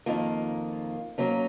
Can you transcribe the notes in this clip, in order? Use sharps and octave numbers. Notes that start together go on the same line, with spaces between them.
F2 D#3 A#3 F4
F#3 A#3 C#4